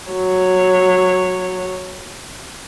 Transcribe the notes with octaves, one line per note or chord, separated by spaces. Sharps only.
F#3 C#5